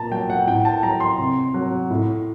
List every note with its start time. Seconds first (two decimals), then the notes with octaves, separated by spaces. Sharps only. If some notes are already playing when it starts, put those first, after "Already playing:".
Already playing: A#2 A5 A#5
0.12 F#3 G5
0.30 F#5
0.47 A2 G5
0.65 A5
0.83 F#3 A#5
1.00 C6
1.19 C3
1.54 F#3
1.90 A2